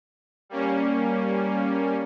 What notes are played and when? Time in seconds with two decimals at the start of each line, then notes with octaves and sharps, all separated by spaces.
0.49 G3 A#3 C#4